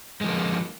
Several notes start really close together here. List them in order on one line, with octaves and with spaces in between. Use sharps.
G#3 F3 A#3